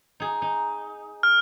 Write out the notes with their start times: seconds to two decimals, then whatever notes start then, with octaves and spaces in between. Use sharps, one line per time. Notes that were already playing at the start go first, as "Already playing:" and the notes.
0.20 D#4 G#4
0.42 D#4
1.23 F6